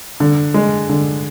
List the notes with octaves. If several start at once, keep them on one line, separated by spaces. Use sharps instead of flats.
D3
G#3
D3